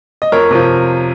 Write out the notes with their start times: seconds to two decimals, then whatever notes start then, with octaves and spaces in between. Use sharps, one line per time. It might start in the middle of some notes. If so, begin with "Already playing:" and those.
0.22 D#5
0.32 F2 A#4 C#5
0.51 C3 F3